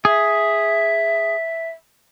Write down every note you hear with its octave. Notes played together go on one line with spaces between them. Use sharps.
G#4 E5